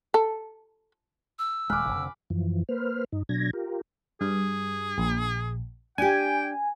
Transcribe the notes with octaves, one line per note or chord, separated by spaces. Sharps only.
A4
E6
D#1 G#3 G#5 B5 D6 F6 F#6
F1 F2 D3
F#2 E3 F3
A#3 B4 C5 F6
G2 D#4
B2 F#3 D4 G#6 A#6
F4 G4 A#4
G2 G#4
A#1
D4 G4 G5 G#5